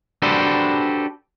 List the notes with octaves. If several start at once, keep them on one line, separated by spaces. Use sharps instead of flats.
D4 F#4 G4 A4 B4 C5